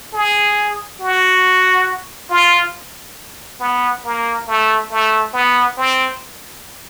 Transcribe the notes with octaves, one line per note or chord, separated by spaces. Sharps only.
G#4
F#4
F4
B3
A#3
A3
A3
B3
C4